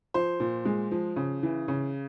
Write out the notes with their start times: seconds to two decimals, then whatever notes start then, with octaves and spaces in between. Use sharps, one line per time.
0.14 F3 C5
0.40 A#2
0.65 G#3
0.91 F3
1.16 C#3
1.43 E3
1.68 C#3